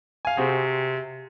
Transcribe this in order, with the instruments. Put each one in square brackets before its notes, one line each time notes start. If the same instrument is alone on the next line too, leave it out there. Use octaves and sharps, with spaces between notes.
[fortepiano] F5 G#5
[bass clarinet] C3 [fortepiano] C4 F#4 G#4